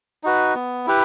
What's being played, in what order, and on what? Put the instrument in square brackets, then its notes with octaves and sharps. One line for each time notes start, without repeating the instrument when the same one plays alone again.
[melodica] D#4 F#4 B4
B3
E4 G4 B4